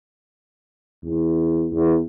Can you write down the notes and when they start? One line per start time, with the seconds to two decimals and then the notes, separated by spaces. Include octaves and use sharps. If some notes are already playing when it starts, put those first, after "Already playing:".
1.04 E2
1.72 E2